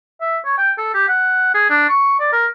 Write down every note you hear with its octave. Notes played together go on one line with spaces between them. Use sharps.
E5
C#5
G5
A4
G4
F#5
G#4
D4
C#6
D5
A#4